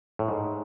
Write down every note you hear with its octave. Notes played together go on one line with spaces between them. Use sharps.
A2
G#2